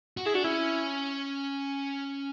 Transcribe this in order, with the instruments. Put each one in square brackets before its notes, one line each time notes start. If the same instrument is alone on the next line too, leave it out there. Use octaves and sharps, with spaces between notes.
[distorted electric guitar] F#4
[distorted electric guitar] E4 [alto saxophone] G#4
[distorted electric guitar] D4 [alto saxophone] F#4
[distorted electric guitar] C#4 [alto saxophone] E4